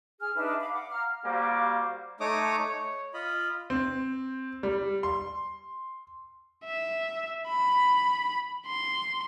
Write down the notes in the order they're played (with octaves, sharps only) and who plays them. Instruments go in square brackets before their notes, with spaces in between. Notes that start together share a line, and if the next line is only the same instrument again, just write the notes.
[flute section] G#4 F6
D4 D#4 B4 E5
F5 B5 D6
F#5 D6
F5 A#5 F6
[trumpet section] G3 A#3 F#4 C5 F5 D6
[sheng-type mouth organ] A3 D#4 C#5 D6 D#6
C#5
F4 D#5 B5
[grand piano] C4
G3
C6
[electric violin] E5
B5
C6